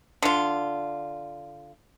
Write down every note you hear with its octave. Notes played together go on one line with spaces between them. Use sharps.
D3 F4